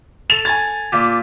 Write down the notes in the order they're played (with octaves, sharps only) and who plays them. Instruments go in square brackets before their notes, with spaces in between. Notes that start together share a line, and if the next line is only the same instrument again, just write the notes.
[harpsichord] A4 [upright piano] F7
[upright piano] G#5 G#6 A6
[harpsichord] A#2 G4